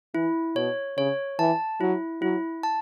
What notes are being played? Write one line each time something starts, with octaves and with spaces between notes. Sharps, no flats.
E3 E4
B2 C#5
C#3 C#5
E3 A5
F#3 E4
F#3 E4
A5